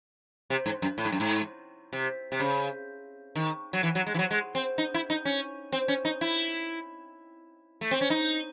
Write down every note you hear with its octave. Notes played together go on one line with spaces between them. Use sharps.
C3
G#2
F#2
A2
G#2
F#2
G#2
C3
C3
C#3
D#3
F#3
E3
F#3
G#3
E3
F#3
G#3
C4
D#4
E4
D#4
C#4
C4
C#4
D#4
E4
A3
C4
C#4
D#4